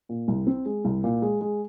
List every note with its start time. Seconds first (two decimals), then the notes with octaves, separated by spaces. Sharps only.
0.09 A#2
0.28 C2
0.47 C4
0.66 G#3
0.85 C2
1.04 A#2
1.22 G#3
1.41 G#3